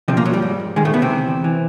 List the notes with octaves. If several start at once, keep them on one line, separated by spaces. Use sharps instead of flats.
C3 F3 C4
A#2 A#3
F#2 F#3
G3
G#2
G#2
G#2 D#3 G#3
A2 A3
D2 B2 B3
C3 C4
E3
E2
E3